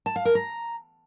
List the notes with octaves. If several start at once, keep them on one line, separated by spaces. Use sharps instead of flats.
A5
F5
A#4
A#5